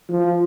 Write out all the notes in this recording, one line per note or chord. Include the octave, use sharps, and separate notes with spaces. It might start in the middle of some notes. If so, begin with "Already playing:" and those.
F3